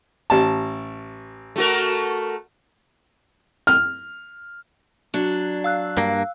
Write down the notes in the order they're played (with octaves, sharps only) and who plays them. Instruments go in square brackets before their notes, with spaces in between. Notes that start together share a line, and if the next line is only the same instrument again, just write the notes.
[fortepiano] A1 A5
[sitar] A3 F#4 A#4
[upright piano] F6
[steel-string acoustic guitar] F#3 D4
[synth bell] F5 E6 F#6
[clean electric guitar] G2 A#3